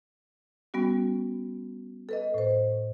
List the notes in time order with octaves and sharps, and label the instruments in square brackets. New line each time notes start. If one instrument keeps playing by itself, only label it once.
[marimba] G3 B3 C#4 F#4
A4 B4 D#5
A2 C5